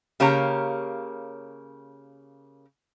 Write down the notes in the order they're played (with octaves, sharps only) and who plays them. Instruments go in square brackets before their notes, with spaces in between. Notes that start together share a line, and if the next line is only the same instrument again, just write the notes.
[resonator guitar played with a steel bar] C#3 A#3 G4 C#5 A#5